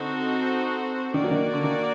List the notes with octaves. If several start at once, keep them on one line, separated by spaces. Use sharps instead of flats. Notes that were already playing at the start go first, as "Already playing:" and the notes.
Already playing: D3 C4 D#4 F#4 A4 C5
D#3 A#3 F#4 A#4 D5
F#3
D#3
D3
D#3